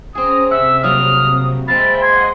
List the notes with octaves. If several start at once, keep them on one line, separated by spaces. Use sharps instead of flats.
C4 C#4 G#4 A#5 D#6
C3 E5 F#5 E6
F#3 G3 A#3 D#6 F6
G#3 C4 E5 F5 G5 B5 A6
D#5 F#5 C6 G#6